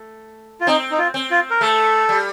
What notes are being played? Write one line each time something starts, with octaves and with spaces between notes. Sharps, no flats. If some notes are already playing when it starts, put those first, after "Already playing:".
Already playing: A3
F4
C4 D#4
D#4
F4
C4
F4
A#4
A3 A4
G3